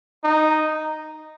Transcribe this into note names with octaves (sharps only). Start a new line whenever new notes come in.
D#4